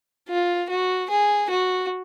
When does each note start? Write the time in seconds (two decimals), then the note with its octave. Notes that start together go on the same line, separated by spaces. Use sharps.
0.29 F4
0.69 F#4
1.10 G#4
1.50 F#4